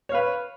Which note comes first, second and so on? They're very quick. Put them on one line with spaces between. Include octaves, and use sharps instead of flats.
C#5 F5 B4